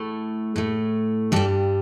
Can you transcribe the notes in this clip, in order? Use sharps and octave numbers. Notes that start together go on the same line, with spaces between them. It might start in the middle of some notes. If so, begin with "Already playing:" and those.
Already playing: A2 A3
A2 A3
G2 G3 A4 D5